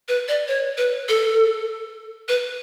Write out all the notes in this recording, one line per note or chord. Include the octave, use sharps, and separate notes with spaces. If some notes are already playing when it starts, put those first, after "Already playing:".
B4
D5
C#5
B4
A4
B4